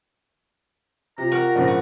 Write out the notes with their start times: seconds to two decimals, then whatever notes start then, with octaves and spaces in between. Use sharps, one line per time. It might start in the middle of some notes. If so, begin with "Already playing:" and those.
1.18 C3 F4 A#5
1.32 F#4 A#4
1.55 A#1 G#2 C#3
1.68 F#4